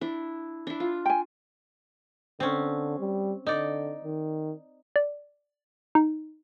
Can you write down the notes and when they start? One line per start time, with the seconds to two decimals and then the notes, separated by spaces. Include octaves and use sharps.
0.01 D4 E4
0.67 D4 E4
0.80 F4
1.05 G5 G#5
2.40 D3 C4 C#4
3.00 G3
3.46 D3 D#4 D5
4.04 D#3
4.96 D5
5.95 D#4